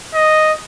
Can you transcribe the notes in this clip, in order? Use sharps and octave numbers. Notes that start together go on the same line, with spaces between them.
D#5